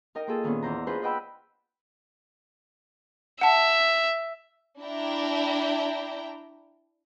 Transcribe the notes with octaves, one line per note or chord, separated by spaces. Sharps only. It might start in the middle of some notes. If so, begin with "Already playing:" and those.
D#4 A#4 D#5 G5
A#3 F4 G#4 A4
A#2 D#3 B3 C#4 D4
E2 E4 C5 A#5
D4 D#4 F4 G#4 B4 C5
B4 D#5 F#5 G5 B5 E6
E5 F#5 A5
D4 E4 G5 A#5